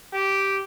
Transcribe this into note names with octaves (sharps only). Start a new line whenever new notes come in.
G4